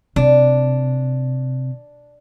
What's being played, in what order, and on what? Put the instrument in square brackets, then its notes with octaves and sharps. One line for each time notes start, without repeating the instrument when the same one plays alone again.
[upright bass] C3 [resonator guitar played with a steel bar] D4